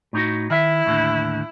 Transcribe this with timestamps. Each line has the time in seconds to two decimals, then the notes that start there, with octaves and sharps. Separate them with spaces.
0.13 A2 D#4 F#4
0.50 D#3 E4 E5
0.86 D#2 A2 D3